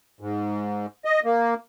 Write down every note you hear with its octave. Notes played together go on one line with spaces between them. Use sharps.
G#2
D#5
A#3